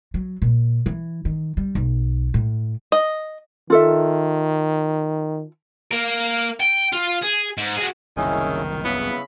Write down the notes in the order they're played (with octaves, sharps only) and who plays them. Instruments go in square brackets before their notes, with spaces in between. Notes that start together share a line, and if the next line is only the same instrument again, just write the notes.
[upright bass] F#3
A#2
E3
D#3
G3
B1
A2
[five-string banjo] D#5
[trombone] D#3 [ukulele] F4 A4 E5
[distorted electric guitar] A#3 A#4
G5
F4
G#4
G#2
F#4 G#4
[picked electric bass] F#1 C2 [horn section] D#3 [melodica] C#4 E4 G#4
[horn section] C#3 B5 [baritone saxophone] B3 [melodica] E4